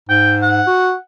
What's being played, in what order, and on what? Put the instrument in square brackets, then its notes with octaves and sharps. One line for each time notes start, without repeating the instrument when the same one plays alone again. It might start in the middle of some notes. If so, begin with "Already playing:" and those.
[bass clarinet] G#2 [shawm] G5
[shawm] F#5
[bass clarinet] F#4